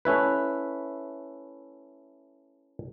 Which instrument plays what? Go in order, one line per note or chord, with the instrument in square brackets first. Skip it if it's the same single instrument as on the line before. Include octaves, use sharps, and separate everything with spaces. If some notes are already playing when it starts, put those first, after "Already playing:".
[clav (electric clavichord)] A3 C#4 E4 B4